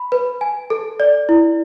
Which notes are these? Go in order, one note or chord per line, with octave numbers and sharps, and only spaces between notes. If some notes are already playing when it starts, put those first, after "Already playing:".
Already playing: B5
B4
G#5
A4
D5
E4